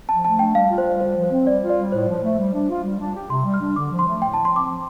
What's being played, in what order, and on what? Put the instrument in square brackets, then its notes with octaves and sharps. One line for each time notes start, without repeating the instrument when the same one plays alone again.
[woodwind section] F3 [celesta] A5
[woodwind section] A3 [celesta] A5
[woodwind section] D4 [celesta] G5
[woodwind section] G3 [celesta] F5
[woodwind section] F4
[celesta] C5
[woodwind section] G3
[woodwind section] D3 [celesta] C5
[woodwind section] F3
[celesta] C5
[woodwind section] C4
[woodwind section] G3 [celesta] D5
[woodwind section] F4
[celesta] D5
[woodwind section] G3
[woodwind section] A2 [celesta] C5
[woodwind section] F3
[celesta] C5
[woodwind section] A3
G3
D4
F4
G3
D4
G4
[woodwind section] C3 [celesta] C6
[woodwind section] G3
[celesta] F6
[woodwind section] D4
[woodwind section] D3 [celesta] D6
[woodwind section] F3
[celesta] C6
[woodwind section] A3
[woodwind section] A2 [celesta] G5
[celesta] A5
[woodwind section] F3
[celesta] C6
[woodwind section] C4 [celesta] D6
[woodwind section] F3